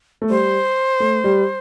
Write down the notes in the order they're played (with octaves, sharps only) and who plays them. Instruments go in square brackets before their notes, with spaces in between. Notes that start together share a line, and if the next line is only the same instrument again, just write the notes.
[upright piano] A3
[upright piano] G3 [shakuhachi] C5
[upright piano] A3
G3